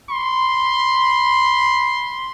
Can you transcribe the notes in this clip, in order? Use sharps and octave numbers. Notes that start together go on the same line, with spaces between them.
B5 C6